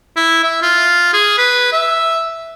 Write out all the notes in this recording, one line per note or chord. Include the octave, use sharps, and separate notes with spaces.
E4
E5
F4
G#4
B4
E5